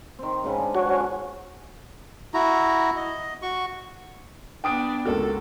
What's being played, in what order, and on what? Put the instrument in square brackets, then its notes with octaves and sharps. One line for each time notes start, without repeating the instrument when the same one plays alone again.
[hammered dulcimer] D#3 C4
G#2 C#3 B4
D4
[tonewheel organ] F#4 C#5
[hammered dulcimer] C#4
[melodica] E4 F#4 A#5
D#5
F#4 C#6
[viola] B3 D4 [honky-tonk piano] G5 D#6 D7
[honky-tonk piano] C#2 A#3 F#4 [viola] A4